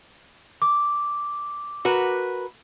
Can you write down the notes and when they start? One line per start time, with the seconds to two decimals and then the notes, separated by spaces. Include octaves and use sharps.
0.62 D6
1.85 F#4 A#4 B4